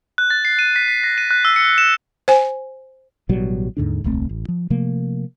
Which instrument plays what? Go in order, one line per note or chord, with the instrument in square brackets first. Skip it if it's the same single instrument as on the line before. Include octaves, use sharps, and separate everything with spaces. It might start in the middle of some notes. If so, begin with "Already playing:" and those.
[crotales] F#6
A6
C7
D#7
B6
B6
A#6
D#7
F#6
E6
C#7
E7
[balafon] C5 G#5
[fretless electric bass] A1 B2 F#3 G3
D#2 G#2 D3 D4
D#1 C2 A3 C4
A1
F3
C3 F3 A3 A#3